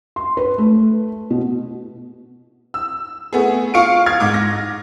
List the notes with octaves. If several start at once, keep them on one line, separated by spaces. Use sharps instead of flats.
C6
B4
A3
B2
E6
A3 B3 G#4
F4 F5 C#6 C#7 D7
F6 G#6
G#2 D6
A#6